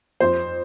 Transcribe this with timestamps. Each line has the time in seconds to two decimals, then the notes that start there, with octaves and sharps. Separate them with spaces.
0.20 F2 C5